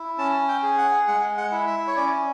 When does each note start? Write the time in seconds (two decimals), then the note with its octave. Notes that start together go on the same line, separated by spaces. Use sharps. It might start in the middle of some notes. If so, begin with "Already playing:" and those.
Already playing: E4
0.18 C#4 A5
0.48 G5
0.63 G#4
0.78 F#5
1.07 G#3 F#5
1.38 F#5
1.52 E4
1.67 E5
1.87 C#5
1.96 C#4 D5